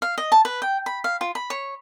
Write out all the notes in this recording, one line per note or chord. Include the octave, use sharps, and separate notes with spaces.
F5
D#5
A5
B4
G5
B5
F5
F4
B5
C#5